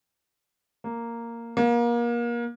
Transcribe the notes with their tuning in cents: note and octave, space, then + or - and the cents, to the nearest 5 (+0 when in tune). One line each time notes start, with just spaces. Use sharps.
A#3 -5
A#3 +30